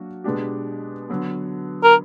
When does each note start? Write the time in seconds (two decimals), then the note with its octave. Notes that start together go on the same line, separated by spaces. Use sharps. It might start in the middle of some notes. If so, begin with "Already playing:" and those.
Already playing: F#3 A#3 D4 F#4
0.24 B2 G#3 B3 D4 G4
1.09 D3 F#3 B3
1.83 A#4